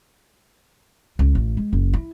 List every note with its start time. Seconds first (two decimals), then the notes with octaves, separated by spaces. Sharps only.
1.19 C#2
1.35 A1
1.57 G#3
1.73 F#1
1.93 E4